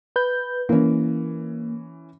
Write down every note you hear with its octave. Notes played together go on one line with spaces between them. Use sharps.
B4 G6
E3 A#3 C#4